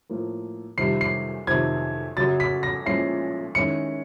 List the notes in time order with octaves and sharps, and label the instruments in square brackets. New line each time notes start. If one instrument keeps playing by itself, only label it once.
[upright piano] A2 F3 A#3
[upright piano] F2 C3 D#3 G3 [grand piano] C7
[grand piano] C7
[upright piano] F2 C3 D#3 [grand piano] G#6
[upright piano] F#2 C#3 F#3 [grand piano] A6
[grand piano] B6
A#6
[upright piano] A#2 F3 G#3 C#4 E4 [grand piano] C7
[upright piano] D#3 G#3 C#4 E4 [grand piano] C#7